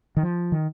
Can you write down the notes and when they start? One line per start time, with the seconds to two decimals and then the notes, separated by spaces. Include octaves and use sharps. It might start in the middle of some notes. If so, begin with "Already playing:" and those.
0.17 D#3
0.23 F3
0.52 D#3